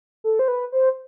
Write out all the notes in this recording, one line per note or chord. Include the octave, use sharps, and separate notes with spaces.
A4
C5
B4
C5